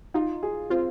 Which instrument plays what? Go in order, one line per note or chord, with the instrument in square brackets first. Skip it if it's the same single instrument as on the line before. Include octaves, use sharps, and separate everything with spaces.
[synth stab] D#4 [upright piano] F4
[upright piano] G#4
[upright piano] C4 [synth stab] F4